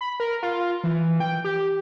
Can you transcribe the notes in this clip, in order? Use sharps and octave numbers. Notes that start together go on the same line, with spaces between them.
B5
A#4
F4
E3
G5
G4